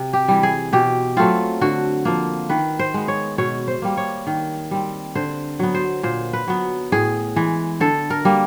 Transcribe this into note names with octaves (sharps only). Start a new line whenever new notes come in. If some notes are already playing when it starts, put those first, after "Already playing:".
Already playing: C3
G4
E3 G3
G#4
B2 G4
F#3 A3 C4 F4
D3 F#4
F3 A#3
D#3 B4
C5
G#3 B3
C#5
B2 C#5
C5
G3 A#3
C#5
D#3
G3 C4
D3 C5
F#3 B3
C5
A#2 C5
B4
F#3 B3
A2 G#4
E3 G#3
D3 A4
A#4
G3 A#3